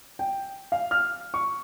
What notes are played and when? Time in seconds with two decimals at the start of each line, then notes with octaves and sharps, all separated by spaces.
0.19 G5
0.72 F5
0.91 F6
1.34 C#6